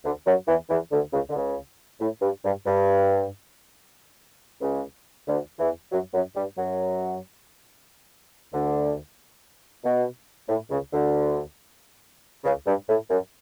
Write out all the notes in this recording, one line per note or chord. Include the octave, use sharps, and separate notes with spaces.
D2 D3
F#2 F#3
E2 E3
E2 E3
D2 D3
C#2 C#3
D3
C#2 C#3
A2
G2
G2
G2
C#2 C#3
D2 D3
E2 E3
F#2 F#3
F#2 F#3
G2 G3
F#2 F#3
D2 D3
B2
A2
C#2 C#3
D2 D3
C#2 C#3
G2
A2
F#2